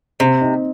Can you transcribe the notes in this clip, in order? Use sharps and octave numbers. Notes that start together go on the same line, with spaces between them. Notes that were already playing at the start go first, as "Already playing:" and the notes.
C3 C4
D#4